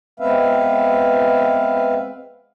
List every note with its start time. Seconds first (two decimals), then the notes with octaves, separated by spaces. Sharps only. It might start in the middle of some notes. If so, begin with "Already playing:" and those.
0.20 G#3 B3 C4 B4 E5 F5